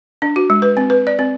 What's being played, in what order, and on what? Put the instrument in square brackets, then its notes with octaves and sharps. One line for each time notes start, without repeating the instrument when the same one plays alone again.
[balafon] D4
F#4
G#3
B4
C4
B4
D5
C4